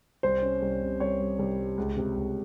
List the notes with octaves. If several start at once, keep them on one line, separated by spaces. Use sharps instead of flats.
C2 C5
C#4
C2
C3
C2 C#5
G3
C2
G3
C#2
C3
C#2